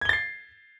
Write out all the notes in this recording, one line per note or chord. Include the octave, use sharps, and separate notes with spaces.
G#6 A6 C7 G7